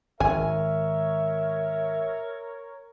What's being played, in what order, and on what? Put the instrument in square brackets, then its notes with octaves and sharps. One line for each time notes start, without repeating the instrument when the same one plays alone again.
[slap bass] G#1 [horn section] A#4 C#5 [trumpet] E5 [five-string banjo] G#5